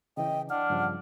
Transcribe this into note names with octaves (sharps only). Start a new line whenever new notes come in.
C#3 E3 D#5 G5
D4 F#5 F6
G2 C#3 F3